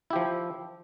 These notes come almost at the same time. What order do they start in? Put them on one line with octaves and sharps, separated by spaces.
E4 G4 F3